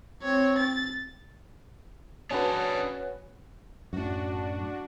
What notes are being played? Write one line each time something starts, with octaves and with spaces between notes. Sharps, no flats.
C4 C#5
A6
C#4 D4 F#4 G#4 B4
F#2 A2 D4 F#4